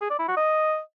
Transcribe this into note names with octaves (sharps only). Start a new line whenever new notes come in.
G#4
D5
E4
F#4
D#5